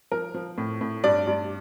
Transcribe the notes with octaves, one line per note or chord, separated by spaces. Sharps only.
F3 A#4
F3
A2
A2
G2 D5
G2